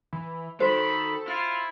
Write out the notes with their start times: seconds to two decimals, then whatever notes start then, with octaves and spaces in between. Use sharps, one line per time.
0.13 E3
0.60 D#3 F#4 A4 C5 B5
1.28 E4 F4 F6